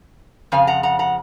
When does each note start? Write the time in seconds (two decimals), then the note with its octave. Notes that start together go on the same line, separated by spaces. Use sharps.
0.52 F2 C#3 F3 F5 G#5
0.67 F#5 A#5
0.83 F#5 A#5
0.99 F#5 A#5